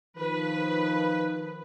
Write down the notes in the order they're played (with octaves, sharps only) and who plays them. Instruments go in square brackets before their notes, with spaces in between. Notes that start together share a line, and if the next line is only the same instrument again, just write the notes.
[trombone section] D#3 F3 [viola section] B4